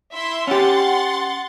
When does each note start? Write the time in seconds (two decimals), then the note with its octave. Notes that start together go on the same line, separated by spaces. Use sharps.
0.12 E4 E5 C6
0.47 C#4 G4 F#5 C6 A6